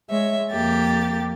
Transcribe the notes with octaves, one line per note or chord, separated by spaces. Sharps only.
G#3 C#5 E5
F2 A#3 G4 A6